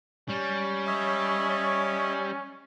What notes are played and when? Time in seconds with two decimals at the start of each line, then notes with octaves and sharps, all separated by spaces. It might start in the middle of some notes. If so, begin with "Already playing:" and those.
0.30 G3 C#4
0.87 C#5 D#5 E5